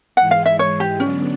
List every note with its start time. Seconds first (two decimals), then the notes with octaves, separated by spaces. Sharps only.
0.17 G#2 E3 G#3 F#5
0.31 F5
0.46 E5
0.59 C#5
0.80 G4
1.00 D3 F#3 B3 C#4 D4